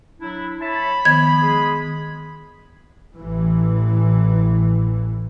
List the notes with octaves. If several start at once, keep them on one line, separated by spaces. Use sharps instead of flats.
F#3 D4 E4
C#5 E5 A5 B5
D#3 F3 B3 G#6
G#3 G#4
A1 E3